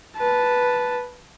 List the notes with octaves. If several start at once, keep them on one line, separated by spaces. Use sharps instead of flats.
B4 A5